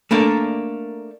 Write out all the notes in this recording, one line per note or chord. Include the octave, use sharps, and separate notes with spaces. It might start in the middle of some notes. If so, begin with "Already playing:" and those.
A3 A#3 D4 A#4